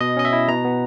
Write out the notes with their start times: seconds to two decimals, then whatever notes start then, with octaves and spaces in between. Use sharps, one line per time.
0.01 B2 D#5
0.17 C#4 D#5
0.25 E5
0.33 E4
0.48 B2 A#5
0.65 B3